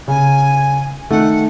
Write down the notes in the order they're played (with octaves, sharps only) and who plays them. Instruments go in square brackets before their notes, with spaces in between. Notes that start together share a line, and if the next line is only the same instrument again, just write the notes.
[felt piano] C#3 [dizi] G#5
[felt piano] D#3 A3 [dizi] F#5